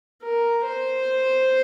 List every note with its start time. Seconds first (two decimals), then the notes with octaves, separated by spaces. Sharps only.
0.22 A#4
0.64 C5